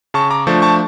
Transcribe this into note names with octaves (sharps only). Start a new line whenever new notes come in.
C#3 A5 C#6
A#5 D6
F3 A3 D4 A5 C#6
A5 C#6